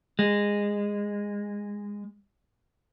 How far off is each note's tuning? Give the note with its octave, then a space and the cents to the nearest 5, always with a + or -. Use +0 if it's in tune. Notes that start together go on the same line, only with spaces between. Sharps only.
G#3 -20